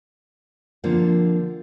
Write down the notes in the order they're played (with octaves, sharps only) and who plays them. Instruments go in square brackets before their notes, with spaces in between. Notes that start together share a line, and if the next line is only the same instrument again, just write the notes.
[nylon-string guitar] D3 F3 A#3 C4